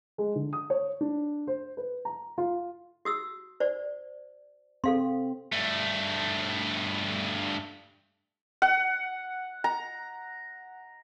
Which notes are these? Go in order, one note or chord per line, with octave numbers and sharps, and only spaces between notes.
G#3
D3
D#6
C#5
D4
C5
B4
A#5
F4
F#4 D#6 E6
C5 D5
C4 A4 F5 C6
G2 A3
F#5
A#5